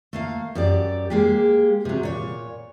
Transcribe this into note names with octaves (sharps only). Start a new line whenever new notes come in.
A3 A#3 F5
F#2 G4 D5
G#3 A#3 G4
C3 F#3
A#2 C#5